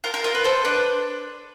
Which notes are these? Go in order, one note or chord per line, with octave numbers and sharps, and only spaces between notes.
F4 A#4
A#4
F4 A#4
B4
A4 C5
D4 B4